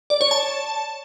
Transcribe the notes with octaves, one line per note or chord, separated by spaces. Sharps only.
D5
C#5
A5